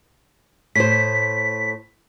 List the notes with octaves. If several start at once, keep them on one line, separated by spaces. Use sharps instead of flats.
A2 C5 B6